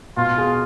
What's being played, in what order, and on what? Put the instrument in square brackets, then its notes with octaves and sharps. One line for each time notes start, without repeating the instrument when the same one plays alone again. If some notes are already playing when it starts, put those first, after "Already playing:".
[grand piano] B2 [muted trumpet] F4
[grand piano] G#4